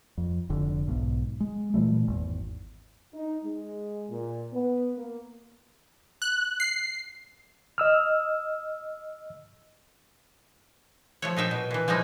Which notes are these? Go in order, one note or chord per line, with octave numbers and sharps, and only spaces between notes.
F2
F1 D3
B1 G#2 B2
G#3
A#2 E3 G3 A3
G#1 E2
D#4
G#3
A#2
B3
A#3
F#6
C7
D#5 E6 F6
F3 A3 C#5
A#2 D#4 E5 G5
B2
A#2 E3
F3 G3 G#3 D#4 E4